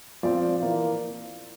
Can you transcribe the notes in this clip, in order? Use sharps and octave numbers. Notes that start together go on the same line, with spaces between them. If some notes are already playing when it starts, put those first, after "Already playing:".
F3 C4 F4 D5
E3 A#3 F4